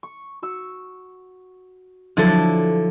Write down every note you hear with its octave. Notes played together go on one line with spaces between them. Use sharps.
C#6
F#4 C#6 E6
D3 F3 F#3 E4 A4